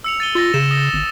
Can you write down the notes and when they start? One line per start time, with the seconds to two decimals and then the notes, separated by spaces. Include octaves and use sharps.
0.04 E6 C#7 F7
0.20 A6 D#7 G7
0.35 F4 E6 A6 A#6
0.54 C#3 E7
0.71 D#6 A#6
0.93 G#1